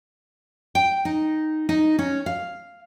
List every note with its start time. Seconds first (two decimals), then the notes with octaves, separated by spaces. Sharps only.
0.75 G5
1.05 D#4
1.69 D#4
1.99 C#4
2.26 F5